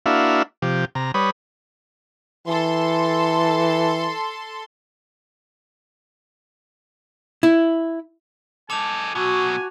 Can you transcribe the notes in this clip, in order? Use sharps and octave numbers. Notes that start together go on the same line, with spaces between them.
A#3 D4 E4 F#4 E5 F5
C3 F3 G4
C3 A#5
G3 B4 C#5 B5 D#6
E3 A4 C6
E4
D#4 A4 G#5 A5 D6 F7
B2 F#3 F#4 G#5